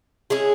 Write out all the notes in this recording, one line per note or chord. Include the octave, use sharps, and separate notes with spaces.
G#3 C#4 E4 G#4